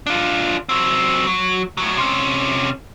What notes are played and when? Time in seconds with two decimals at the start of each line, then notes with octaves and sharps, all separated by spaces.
0.06 D4 F4
0.69 F#3 C4
1.27 F#3
1.77 A2 F#3
1.97 C3 C#4